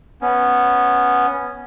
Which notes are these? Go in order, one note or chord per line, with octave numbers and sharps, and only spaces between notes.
B3 C#4